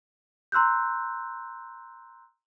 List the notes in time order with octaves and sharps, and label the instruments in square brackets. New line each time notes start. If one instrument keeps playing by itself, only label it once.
[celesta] A#5 C6 E6 F#6 G6